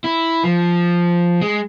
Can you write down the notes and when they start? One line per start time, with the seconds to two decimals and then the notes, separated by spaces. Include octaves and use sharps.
0.04 E4
0.44 F3
1.42 G#3